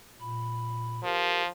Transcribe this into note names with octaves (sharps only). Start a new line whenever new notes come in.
A#2 B5
F3 G4 A#4